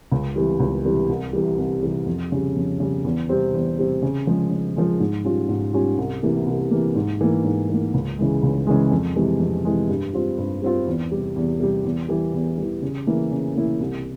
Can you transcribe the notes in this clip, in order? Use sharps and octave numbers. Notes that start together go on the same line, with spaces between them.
C#2
C3 E3 G3
C#2
C3 E3 G3
C2
C3 E3 G3
C2
C3 E3 G3
F2
C#3 G3
F2
C#3 G3
E2
C3 G3 C4
E2
C3 G3 C4
C#3
F3 G#3
C#3
F3 G#3
G#2
G3 C#4 F4
G#2
G3 C#4 F4
C2
C3 E3 A#3
C2
C3 E3 A#3
G#2
E3 A#3
G#2
E3 A#3
C#2
C#3 E3 G#3
C#2
C#3 E3 G#3
F2
C3 E3 G#3
F2
C3 E3 G#3
G2
G3 C4 F4
G2
G3 C4 F4
E2
C3 G3
E2
C3 G3
E2
E3 G3
E2
E3 G3
C#3
E3 A#3 E4
C#3
E3 A#3 E4
C2